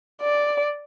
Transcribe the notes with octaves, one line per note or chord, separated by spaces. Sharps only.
D5